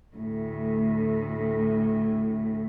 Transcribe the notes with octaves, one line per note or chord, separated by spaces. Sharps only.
D2 A2